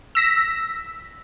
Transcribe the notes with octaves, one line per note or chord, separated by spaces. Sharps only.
E6 A#6 B6